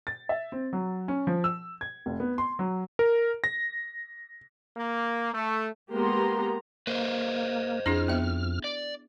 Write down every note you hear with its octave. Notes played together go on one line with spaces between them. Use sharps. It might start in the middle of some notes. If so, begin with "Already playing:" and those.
A6
E5
C4
F#3
C#4
F3
E6
G#6
F1
B3
C6
F#3
A#4
A#6
A#3
A3
G#3 A#3 B3 G4 A#5 C6
A#3 B4 C5 D#5
F2 D4 E4 G#4 F6
B3 E5
D5